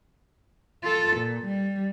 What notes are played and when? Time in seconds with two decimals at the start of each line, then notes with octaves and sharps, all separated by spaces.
0.83 F4 A4
1.17 A#2
1.45 G3